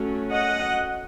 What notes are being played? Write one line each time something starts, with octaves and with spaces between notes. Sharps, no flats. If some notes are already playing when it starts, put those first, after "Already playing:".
Already playing: F#3 A3 C#4
D#5 F#5